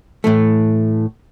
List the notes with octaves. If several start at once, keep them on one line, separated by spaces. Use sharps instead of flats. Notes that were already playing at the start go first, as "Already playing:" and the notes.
A2 E3 A3